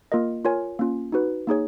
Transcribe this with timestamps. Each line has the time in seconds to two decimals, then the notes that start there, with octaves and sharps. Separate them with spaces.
0.12 A#3 F4 A#4 D#5
0.45 F4 A#4 C#5 G#5
0.79 A#3 C#4 F4
1.12 D#4 F#4 B4
1.47 A#3 D#4 G#4 C#5